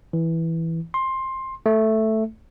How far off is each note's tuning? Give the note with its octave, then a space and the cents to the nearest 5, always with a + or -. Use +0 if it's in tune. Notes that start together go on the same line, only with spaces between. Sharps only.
E3 -5
C6 +15
A3 +0